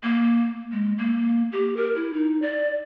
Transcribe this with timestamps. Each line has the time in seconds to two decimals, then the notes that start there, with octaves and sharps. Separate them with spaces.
0.03 A#3
0.72 G#3
0.98 A#3
1.52 G4
1.77 A#4
1.96 E4
2.13 D#4
2.42 D5